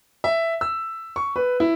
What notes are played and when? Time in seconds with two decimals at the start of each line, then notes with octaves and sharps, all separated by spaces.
0.24 E5
0.61 E6
1.16 C#6
1.36 B4
1.60 E4